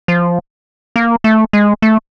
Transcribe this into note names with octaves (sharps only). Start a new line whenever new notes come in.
F3
A#3
A3
G#3
A3